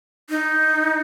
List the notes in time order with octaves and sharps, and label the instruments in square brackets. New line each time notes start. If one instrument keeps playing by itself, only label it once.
[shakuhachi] D#4